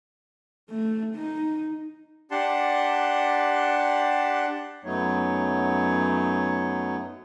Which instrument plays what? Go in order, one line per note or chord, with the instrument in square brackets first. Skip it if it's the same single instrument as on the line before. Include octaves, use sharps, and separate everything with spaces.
[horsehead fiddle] A3
D#4
[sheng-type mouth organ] D4 G4 F#5 A5 C6
[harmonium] F#2 F#3 A3 B3 D#4 C#5